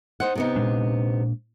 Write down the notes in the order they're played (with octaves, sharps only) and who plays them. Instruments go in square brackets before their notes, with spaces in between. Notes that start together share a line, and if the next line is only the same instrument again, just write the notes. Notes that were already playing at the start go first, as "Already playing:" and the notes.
[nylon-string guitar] D#4 C5 F#5
C3 B3 D#4
[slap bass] A#2 G#3 D4